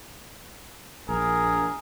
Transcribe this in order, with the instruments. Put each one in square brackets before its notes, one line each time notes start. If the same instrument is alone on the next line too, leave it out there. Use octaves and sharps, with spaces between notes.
[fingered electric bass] A#1 [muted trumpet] G#4 [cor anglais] A#4